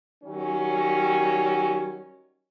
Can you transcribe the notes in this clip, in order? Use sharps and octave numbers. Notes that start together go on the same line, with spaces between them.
D#3 F#3 G3 C#4